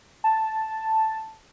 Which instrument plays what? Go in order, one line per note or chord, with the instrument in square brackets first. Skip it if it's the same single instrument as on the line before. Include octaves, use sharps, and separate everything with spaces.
[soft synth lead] A5